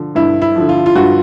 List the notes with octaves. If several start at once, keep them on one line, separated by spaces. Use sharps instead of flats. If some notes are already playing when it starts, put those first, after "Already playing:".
Already playing: D3 F3
G2 E4
E4
D3 F3
F4
F4
G2 F#4